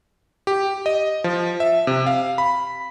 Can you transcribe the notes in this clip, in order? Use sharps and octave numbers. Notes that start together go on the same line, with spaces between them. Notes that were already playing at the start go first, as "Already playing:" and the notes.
G4
D#5
F3
E5
C3
F5
B5